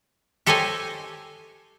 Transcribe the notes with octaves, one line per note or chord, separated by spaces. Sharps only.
G4 A4 C5 C#5 D#5 G#5